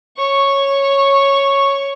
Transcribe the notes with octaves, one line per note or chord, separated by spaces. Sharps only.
C#5 C#6